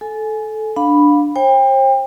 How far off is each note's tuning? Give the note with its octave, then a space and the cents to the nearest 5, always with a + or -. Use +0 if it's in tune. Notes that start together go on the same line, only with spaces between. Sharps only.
A4 -15 G#5 +15
D4 +0 F5 +20 B5 +0
C5 +40 G5 +30